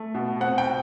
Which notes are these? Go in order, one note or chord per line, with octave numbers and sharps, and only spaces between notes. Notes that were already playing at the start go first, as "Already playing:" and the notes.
Already playing: A3
B2
C4 F#5
G5